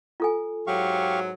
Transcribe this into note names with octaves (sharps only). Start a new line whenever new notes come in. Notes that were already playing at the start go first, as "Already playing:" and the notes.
F4 A4 G#5
G#2 F#3 G4 F5 C#6